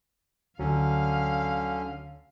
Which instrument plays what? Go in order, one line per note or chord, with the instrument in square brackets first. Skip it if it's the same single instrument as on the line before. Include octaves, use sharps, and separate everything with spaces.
[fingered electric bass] D2 [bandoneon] D3 C#4 [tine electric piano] F#3 [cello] F5